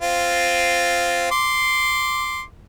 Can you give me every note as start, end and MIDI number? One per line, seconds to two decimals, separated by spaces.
0.01 1.27 60
0.01 1.27 65
1.31 2.43 84
1.31 2.43 86